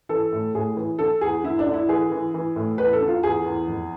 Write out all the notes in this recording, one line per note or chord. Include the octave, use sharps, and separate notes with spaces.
E3 A4
A2
A2 G#4
E3
D3 A4
E2 G#4
D3 E4
D4
D3
E4
E3 G#4
E3
E3
A2
E2 B4
A4
D3
F4
E2 G#4
E2
F2